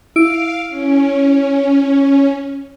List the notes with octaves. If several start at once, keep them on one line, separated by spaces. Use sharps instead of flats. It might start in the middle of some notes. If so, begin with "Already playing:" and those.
E4 F5 D7
C#4